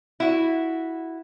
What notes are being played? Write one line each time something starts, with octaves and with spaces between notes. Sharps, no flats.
E4 F#4